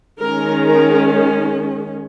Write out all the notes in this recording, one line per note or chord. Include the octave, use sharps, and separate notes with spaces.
D#3 G#3 C#4 A#4
A#4